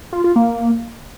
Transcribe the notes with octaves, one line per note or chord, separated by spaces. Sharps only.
F4
F4
A#3